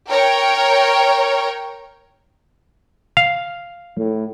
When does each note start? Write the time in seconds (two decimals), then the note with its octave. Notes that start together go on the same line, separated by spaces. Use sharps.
0.10 A#4 C#5 G5
3.17 F5
3.98 A2